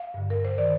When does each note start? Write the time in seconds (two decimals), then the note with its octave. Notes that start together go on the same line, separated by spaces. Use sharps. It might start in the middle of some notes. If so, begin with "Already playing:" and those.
Already playing: F5
0.14 G2 D3
0.30 A#4
0.45 C5
0.58 D#3 D5